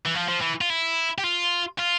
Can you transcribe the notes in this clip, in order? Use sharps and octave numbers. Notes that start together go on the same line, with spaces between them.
E3
F3
F3
E3
F4
E4
G4
F4
F4